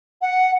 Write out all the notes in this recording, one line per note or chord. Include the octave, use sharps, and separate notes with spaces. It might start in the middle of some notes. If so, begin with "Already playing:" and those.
F#5